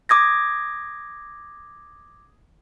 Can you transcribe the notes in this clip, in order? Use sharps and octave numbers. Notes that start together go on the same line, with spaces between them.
D6 D#6 G#6 A#6